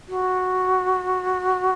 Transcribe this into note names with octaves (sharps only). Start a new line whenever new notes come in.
F#4